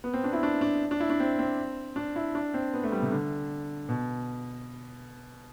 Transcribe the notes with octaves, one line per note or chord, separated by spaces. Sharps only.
B3
C4
D4
E4
D4
D4
D4
E4
D4
C4
C4
D4
E4
D4
C4
B3
A3
G3
C3
D3
B2